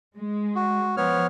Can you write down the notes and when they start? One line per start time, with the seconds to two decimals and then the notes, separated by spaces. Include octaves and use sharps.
0.17 G#3
0.56 F#4
0.97 F3 B3 C#5 F6